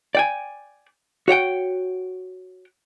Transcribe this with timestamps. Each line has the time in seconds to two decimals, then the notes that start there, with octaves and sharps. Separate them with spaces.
0.15 D5 G5 G#5
1.28 F#4 C#5 F#5 G5